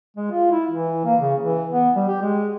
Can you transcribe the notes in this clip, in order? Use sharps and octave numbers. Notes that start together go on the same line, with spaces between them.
G#3
F4
E4
E3
A#3
C#3
E3
B3
G3
G4
G#3